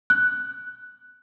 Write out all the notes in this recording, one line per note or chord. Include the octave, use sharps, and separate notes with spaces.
F#6